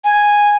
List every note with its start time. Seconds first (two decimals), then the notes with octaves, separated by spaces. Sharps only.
0.04 G#5